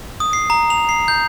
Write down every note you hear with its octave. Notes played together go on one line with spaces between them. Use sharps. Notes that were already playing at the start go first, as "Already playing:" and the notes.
D#6
C7
A#5
F7
C7
G6